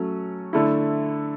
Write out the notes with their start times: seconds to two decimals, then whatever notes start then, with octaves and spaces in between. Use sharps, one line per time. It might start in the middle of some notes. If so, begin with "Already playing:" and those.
Already playing: F#3 A3 C#4
0.53 D3 A3 E4